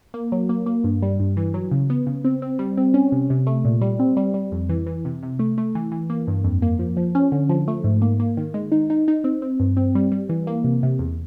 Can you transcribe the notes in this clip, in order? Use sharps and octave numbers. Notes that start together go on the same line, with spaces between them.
A#3
F#3
A#3
A#3
G2
G3
G2
E3
F#3
C#3
B3
C#3
C4
C4
G3
C4
C#4
C3
C3
A3
A#2
G3
C4
G3
G3
F2
E3
E3
C3
C3
A3
A3
E3
E3
A#3
G2
F2
A#3
F3
F3
C#4
D3
F3
A3
G#2
A#3
A#3
D#3
G#3
D#4
D#4
D#4
C4
C4
G2
C4
G3
G3
E3
A#3
C3
C3
E2